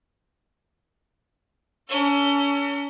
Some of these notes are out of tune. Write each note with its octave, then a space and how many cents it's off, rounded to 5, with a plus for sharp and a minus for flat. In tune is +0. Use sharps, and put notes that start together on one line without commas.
C#4 +35 A4 +40